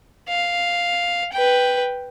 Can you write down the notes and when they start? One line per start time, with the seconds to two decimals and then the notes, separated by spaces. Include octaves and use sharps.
0.29 F5
1.33 B4 G5